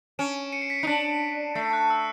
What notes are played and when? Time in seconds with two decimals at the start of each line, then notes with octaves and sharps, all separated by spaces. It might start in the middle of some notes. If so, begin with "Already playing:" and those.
0.19 C#4 D7 E7
0.52 C#7 D#7
0.62 C7 D7
0.70 B6 C#7
0.79 C7 D7
0.83 D#4
0.87 D4 B6 C#7
1.55 A3 C7
1.73 F#6
1.90 E6